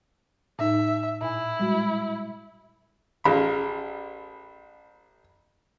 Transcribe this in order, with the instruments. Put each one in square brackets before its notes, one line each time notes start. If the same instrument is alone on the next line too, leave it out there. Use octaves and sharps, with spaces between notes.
[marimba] A2 D#4 [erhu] E5
[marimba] A#2 G#5 [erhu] E4
[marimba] G3 G#3 F#4
[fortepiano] A1 F4 [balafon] C#4 G#4 [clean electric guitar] B5